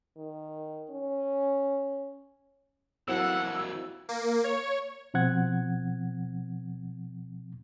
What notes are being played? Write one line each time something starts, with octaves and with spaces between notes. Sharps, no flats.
D#3
C#4
E3 F#3 A#3 C4 E4 A4 F#5 E6
A#3
C#5
B2 F3 C4 F#5 G#6